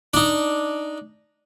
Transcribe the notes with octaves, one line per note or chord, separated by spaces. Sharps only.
D4 D#4